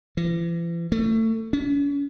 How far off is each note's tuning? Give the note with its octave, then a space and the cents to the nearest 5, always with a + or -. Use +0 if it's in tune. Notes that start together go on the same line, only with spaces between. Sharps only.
E3 +45
A3 +25
C#4 +40